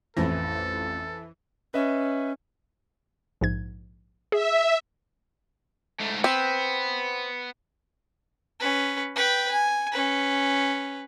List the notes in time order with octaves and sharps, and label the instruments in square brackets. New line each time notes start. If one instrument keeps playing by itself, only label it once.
[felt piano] A1 F2 A#6 [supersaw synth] E3 [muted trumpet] A4
[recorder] C#4 [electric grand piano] B4 D#5 E5
[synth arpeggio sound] A#1 G#2 G#6
[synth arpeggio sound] G#4 [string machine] E5
[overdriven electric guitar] G#2 A3
[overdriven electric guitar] B3 [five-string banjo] C4
[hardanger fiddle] C#4 B4
B4 G5
G#5
C#4 B4